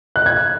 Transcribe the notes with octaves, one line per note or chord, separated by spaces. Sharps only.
F#6
G#6